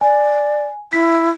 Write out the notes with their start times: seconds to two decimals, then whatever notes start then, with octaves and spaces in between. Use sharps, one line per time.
0.01 D5 G#5
0.93 E4 B6